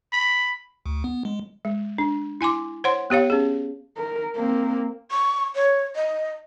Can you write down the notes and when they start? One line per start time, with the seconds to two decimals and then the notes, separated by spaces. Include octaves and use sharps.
0.13 B5
0.86 D2
1.04 B3
1.25 G#3
1.65 G#3
1.98 D4
2.41 E4 G#5 C6 D6
2.84 C5 C#5 F#5 C6
3.10 B3 G4 C#5 F5
3.30 C#4 G#4
3.97 A#4
4.36 A#3 C4
5.11 C#6
5.55 C#5
5.95 D#5